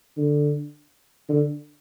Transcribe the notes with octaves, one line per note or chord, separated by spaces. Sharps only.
D3
D3